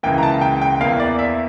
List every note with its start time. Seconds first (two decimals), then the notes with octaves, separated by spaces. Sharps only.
0.03 C#2 C#3 E3 A#3 G5
0.18 A#5
0.23 A5
0.41 G5
0.61 G5
0.80 E2 E3 A#3 F5
1.00 D5
1.19 E5